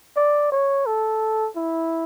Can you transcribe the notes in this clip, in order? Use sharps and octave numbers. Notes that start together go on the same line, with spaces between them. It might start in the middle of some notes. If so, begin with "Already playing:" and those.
D5
C#5
A4
E4